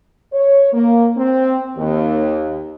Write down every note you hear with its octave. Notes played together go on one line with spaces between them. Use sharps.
C#5
A#3
C4
D#2